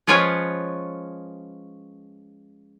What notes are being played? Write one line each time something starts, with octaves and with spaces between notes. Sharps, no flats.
F3 G#3 C#4 F4 B4 C#5